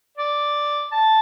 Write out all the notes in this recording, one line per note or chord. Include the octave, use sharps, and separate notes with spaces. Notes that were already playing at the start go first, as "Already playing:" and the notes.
D5
A5